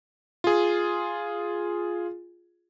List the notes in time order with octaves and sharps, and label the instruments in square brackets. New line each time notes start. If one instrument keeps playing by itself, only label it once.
[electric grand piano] F4 G#4